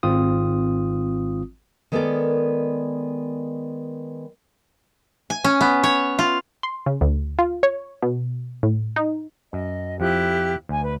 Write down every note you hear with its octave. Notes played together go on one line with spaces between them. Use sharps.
G#1 C4 F4 D#6
D#3 G#3 B3 A4 A#4 D5
G#5
C#4
B3
C#5
F4
C6
C#3
D2
F4
C#5
B2
A2
D#4
F#2 D#5
F2 F3 E4 G4 F#6
D2 G#5
B4